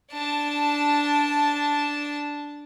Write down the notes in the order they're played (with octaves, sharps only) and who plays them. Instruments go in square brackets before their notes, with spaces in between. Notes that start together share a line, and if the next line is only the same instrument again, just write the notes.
[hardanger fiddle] D4 A5